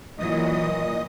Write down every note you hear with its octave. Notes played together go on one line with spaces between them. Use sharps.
A#2 E3 F#3 D#5 D#6